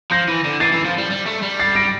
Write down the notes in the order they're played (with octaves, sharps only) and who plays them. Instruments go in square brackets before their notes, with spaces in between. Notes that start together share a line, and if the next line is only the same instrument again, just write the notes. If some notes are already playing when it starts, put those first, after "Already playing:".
[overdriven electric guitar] F3 [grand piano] G6 A#6
[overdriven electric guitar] E3
D3
[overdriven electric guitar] E3 [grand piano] A6 C7
[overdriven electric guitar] E3
F3
G3
G3
A3
G3
[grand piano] A6 C7
A#6 D7